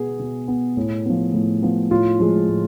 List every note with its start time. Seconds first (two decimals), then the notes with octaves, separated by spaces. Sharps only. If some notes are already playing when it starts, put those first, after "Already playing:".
Already playing: B2 B3 G#4
0.19 B2
0.48 B3
0.77 A2
1.05 F3 B3
1.34 A2
1.62 F3 B3
1.91 A2 F4
2.19 F3 G#3
2.48 A2